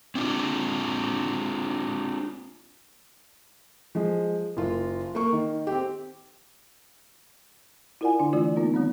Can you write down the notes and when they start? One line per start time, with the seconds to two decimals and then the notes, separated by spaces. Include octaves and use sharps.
0.15 C4 D4 F4
3.95 F3 G#3
4.57 F#1 F4
5.15 A#3 C#6
5.33 D#3
5.67 C4 G4
8.01 E4 F4 A#4 D5 F#5 G#5
8.20 D3 D4
8.33 E3 A3 F4 D5
8.56 A#3 B3 D#4 F4 A#4
8.74 D#3 G3 B3 C4